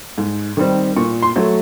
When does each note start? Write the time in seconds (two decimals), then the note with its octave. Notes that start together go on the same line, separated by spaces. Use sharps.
0.18 G#2
0.57 D#3 G3 C4
0.96 A#2 C#6
1.22 C6
1.36 F#3 A3